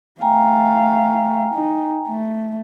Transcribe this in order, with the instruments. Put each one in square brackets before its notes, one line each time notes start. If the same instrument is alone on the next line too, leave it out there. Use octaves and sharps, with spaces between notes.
[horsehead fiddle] A3 F5 [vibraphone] G5 G#5 A#5
[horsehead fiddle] D#4
A3